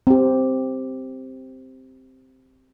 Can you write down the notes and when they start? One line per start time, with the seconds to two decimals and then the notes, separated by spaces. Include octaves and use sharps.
0.07 C4 G4